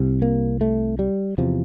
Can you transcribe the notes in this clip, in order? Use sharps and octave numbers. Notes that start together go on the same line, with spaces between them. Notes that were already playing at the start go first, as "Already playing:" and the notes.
Already playing: C2 C3
A#3
A3
G3
E2 C3 F3